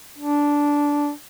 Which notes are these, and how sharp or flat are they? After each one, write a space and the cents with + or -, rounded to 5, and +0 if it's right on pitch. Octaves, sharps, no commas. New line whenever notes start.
D4 -10